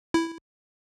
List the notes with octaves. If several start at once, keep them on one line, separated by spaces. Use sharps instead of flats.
E4